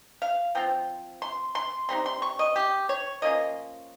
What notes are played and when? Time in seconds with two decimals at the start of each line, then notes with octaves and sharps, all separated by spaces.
0.22 F5
0.55 F3 C4 F4 G5
1.22 C6
1.55 C6
1.89 C3 G3 C4 D#4 C6
2.06 C6
2.22 C#6
2.39 D#5
2.56 G4
2.89 C#5
3.22 F3 A#3 C#4 F4 D#5